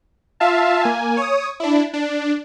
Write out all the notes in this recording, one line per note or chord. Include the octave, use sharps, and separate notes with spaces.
F4 E5 F5 A5
A#3 G#5
C#5 D#6
D4 E4
D4